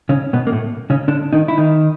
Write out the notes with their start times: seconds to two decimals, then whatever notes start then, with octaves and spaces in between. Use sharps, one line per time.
0.09 C#3 C#4
0.33 B2 B3
0.47 A#3
0.52 A2 A3
0.90 C#3 C#4
1.08 D3 D4
1.33 D#3 D#4
1.48 E4
1.58 D#3 D#4